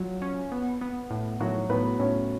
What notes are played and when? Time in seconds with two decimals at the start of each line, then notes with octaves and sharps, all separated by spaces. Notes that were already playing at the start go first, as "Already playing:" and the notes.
Already playing: F#3 F4
0.22 C#4
0.52 B3
0.81 B3
1.10 A2
1.40 A2 F#3 F#4
1.70 A2 B3 B4
1.99 A2 C#4 C#5